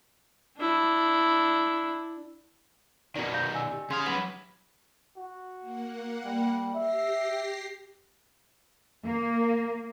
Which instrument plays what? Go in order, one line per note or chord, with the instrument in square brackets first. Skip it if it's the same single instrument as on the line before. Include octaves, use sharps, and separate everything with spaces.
[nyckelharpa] D4 E4
[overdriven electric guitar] B2 D#3 [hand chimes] D5 A#5
[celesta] F5 G6 A#6
G#5 E6
[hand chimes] D#4 G4
[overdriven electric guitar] C#3 F5 [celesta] C6 D#6 [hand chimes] G#6
[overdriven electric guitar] F#3 B4 [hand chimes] F#5 C#6
[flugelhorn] F#4
[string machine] A#3 F#5
[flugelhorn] G3
[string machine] G4 A#6 C7 [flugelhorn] E5
[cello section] A#3